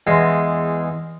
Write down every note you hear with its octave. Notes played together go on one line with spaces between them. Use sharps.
E2 G#3 C6